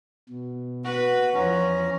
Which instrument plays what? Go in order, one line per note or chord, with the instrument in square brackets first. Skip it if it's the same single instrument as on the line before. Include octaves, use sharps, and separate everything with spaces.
[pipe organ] B2
[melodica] F#4 [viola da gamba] B4
[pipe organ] E2 A#5 [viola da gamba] F3 [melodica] C#4